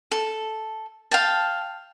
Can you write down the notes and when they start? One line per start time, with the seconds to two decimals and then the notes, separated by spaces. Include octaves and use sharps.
0.12 A4
1.11 F5 G5 A5